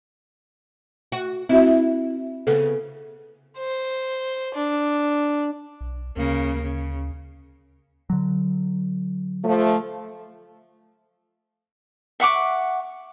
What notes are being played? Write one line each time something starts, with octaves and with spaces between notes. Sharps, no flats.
F#4
C4 E4 F#4
C#3 B3 A4
C5
D4
B1
D2 C#3 A#3
C#3
D3 F#3
F3 A3
E5 F#5 C#6 D6